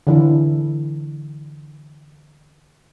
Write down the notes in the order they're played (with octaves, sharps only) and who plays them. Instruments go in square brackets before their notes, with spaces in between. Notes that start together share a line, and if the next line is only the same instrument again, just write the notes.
[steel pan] D3 E3 E4